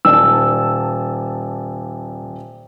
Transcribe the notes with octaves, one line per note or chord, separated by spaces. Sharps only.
D#1 D5 A5 E6